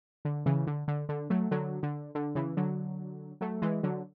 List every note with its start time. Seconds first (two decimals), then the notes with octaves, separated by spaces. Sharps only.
0.25 D3
0.46 C#3 E3
0.67 D3
0.88 D3
1.09 D3
1.30 F#3 A3
1.51 D3 F#3
1.83 D3
2.15 D3
2.35 C#3 E3
2.57 D3 F#3
3.41 F#3 A3
3.62 E3 G#3
3.83 D3 F#3